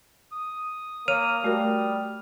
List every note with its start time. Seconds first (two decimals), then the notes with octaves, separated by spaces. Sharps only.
0.32 D#6
1.08 A#3 C#5 F6 D#7 F7
1.44 G3 A3 F#4 A#4